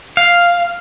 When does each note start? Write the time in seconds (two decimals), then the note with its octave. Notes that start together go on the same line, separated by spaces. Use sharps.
0.17 F5